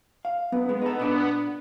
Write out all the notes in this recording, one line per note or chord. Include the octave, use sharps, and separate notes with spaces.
F5
F#2 B3
G#3
D#4 A4
A#2 D4 A4